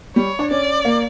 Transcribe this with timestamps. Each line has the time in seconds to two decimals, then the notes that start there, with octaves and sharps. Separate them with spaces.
0.16 G3 C#5
0.39 D4
0.50 C#4 D5
0.85 A#3